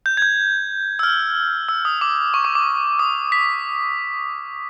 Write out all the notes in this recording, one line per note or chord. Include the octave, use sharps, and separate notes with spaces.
G6
G#6
G6
E6
F6
E6
D#6
D6
C#6
D6
D6
D#6
B6